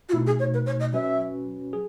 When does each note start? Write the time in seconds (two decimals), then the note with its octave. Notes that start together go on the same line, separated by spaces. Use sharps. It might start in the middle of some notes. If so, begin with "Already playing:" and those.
0.09 F#4
0.13 B2 A3 D#4 E4
0.26 G#4
0.39 C#5
0.54 B4
0.66 C#5
0.80 D#5
0.93 F#3 C#4 F#4 B4 E5
1.73 G#4